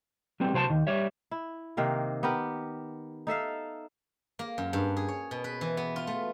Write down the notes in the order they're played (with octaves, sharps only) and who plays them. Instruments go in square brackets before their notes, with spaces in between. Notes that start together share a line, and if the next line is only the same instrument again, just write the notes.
[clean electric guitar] F#3 G3 B3 C4
C2 F#3 C5 G5 A5
D#2 D#3
G3 C#5 E5
[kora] E4
C3 D#3 A#3 A#4
B3 G4 A#4
D#4 A4 E5 F5
[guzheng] A#3
F#2
G2
G#4
C#5
B2
B4
E3
B3
F4
A3